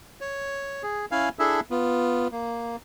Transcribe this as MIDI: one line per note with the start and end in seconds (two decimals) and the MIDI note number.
0.21 0.83 73
0.83 1.06 68
1.11 1.29 61
1.11 1.29 64
1.11 1.29 77
1.11 1.29 80
1.39 1.60 62
1.39 1.60 64
1.39 1.60 68
1.39 1.60 69
1.39 1.60 76
1.71 2.28 59
1.71 2.28 65
2.32 2.76 58